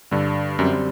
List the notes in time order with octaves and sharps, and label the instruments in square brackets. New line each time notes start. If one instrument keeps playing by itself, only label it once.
[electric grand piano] G2 [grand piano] D3
[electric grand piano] F#2 [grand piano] G3 C4